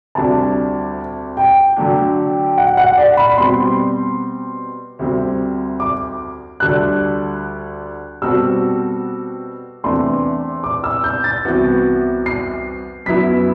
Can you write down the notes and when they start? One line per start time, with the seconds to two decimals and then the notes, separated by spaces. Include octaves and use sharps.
0.15 D2 C3 G3 D4 A5
1.37 G5
1.76 D3 F#3 A3 D4
2.58 F#5
2.77 F#5
2.97 D5
3.17 B5
3.31 B5
3.38 B2 G3 C4 C6
4.99 D2 C3 G3 C4
5.80 D6
6.60 D2 D3 G3 D4 A4 F#6
8.22 B2 G3 C4 F#4 A4 E6
9.84 E2 C3 E3 A3 D4 C6
10.64 D6
10.84 E6
11.04 G6
11.24 A6
11.45 C2 C3 E3 B3 F#4
12.26 C7
13.06 F#2 F#3 B3 E4 B6